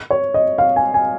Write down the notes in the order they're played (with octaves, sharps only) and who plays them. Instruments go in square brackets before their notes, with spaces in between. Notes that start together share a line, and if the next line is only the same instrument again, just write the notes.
[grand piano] C#5
D#5
F5
G#5
G#5